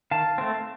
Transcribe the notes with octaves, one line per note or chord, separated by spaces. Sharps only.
D#3 F5 A5
A3 C4